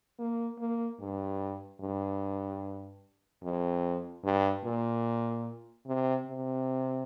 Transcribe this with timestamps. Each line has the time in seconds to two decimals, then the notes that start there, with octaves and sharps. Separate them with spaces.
0.19 A#3
0.59 A#3
1.00 G2
1.80 G2
3.43 F2
4.24 G2
4.64 A#2
5.87 C3
6.27 C3